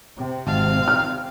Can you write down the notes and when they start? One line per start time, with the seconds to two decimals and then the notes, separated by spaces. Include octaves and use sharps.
0.17 C3 C4
0.47 G#1 F5 A5
0.88 G5 F6